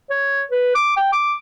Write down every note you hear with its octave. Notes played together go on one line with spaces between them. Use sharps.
C#5
B4
D6
G5
D6